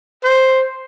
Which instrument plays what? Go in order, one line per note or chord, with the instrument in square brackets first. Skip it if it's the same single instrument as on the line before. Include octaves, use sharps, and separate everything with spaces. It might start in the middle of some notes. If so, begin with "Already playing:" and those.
[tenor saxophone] C5